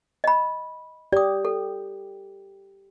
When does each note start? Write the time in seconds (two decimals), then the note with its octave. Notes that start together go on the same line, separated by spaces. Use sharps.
0.24 D#5 B5
1.12 G4 D5 D#6
1.45 A4